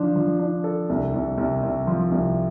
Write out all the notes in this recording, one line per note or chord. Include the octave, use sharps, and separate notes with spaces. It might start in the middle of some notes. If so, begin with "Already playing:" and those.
Already playing: D3 F3 D4
F3
D4
A4
C2
C2
C2
C2
F3
C2